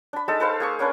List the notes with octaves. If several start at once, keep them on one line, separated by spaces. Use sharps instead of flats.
D4 B5
G#3 D#4 A4 A5
A4 B4 C5 F5
A#3 G#4 C#6
A#3 C#4 D4 B4